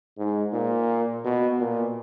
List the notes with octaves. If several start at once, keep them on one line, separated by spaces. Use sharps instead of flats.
G#2
A#2
B2
A#2